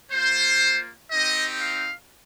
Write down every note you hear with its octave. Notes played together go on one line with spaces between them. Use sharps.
A#3 F4 C5
C4 D#4 G4 D#5
F5